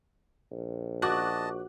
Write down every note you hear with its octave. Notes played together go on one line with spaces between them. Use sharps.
A#1
F#4 D#5 A5 D6 F#6